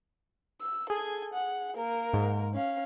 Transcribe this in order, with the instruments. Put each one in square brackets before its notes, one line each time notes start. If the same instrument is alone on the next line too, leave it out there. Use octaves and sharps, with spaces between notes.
[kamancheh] E6
[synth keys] G#4 [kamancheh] A4 G#5
[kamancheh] F#5
A#3 A#4
[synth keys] G#2
[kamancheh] C#4 F5